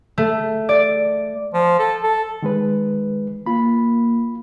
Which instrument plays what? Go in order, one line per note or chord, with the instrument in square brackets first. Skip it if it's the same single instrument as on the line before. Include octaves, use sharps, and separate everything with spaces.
[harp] A3
D5
[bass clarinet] F3
A4
A4
[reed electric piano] D#3 G#3 B4
[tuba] A#3 [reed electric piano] F4 B5